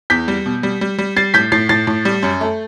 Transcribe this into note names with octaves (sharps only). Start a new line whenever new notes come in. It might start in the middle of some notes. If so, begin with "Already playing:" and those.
E2 G6 B6
G3
B2
G3
G3
G3
G3 A6 C7
A2 G6 B6
A2 A6 C7
A2 A6 C7
A2
G3
F#2
A3